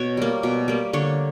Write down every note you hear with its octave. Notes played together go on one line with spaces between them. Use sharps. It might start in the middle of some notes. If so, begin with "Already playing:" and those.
Already playing: B2 C#5
G3 A#3
B2
G3 A#3
D3 C#5